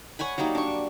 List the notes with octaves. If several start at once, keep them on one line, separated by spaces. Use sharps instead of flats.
C#5 F#5 G#5 B5
F#3 G3 A#3 D#4
D4 C#6